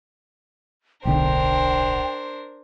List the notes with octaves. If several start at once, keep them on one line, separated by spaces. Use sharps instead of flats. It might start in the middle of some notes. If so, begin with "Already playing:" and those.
D1 B1 D3 D4 A#4 C5 G5